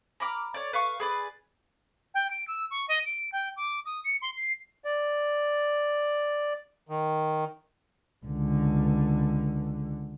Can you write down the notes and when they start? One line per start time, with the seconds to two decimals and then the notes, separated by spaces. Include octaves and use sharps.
0.20 A#5 B5 D6 F6
0.54 C#5 D5
0.73 B4 F5 C#6
1.00 G#4 B4 D5
2.14 G5
2.31 D7
2.48 E6
2.71 C#6
2.88 D#5
3.06 D7
3.32 G5
3.56 D6
3.86 D#6
4.04 C#7
4.22 C6
4.36 C7
4.85 D5
6.89 D#3
8.26 C#2 D3